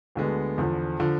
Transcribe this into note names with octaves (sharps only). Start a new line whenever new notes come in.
D2 D3 G#3 B3
E2 D3 F3
D3 F3